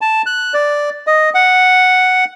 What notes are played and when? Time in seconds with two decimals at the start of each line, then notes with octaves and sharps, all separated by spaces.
0.01 A5
0.26 F#6
0.54 D5
1.07 D#5
1.34 F#5